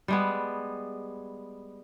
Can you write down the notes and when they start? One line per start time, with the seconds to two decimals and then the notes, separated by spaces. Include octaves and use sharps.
0.08 G3 G#3 B3